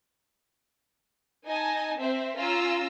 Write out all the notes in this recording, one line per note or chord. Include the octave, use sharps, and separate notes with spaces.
D#4 D#5 G#5 A5
C4 C5 E5
C#4 F4 A#5 E6